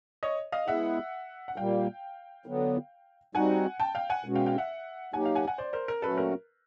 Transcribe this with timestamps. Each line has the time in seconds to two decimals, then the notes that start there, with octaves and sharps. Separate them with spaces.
0.23 C#5 D#5
0.52 D#5 F5
0.67 G#3 B3 E4 G#4 E5 F#5
1.48 F#5
1.56 A#2 G3 A#3 F5 G5
2.46 D3 F#3 B3
3.35 G3 C4 D#4 F#4 F#5 G#5
3.80 G5 A5
3.95 F5 G5
4.10 F#5 G#5
4.24 B2 G#3 C#4 F#4
4.35 F5 G5
4.46 F5 G5
4.58 E5 F#5
5.13 F#3 A#3 D#4 G4 F#5 G#5
5.25 F5 G5
5.35 F#5 G#5
5.47 F#5 G#5
5.58 C5 D5
5.73 A#4 C5
5.88 A#4
6.02 A#2 F#3 A3 C#4 F#4 A4 B4
6.18 A#4